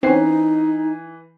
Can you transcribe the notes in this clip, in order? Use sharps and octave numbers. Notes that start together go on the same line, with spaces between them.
E3 C4 C#4 D#4 C7